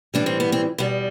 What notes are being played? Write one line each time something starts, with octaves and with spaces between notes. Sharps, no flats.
A2 E3 G3 D4
C4
B3
C4
E2 B2 G3 B3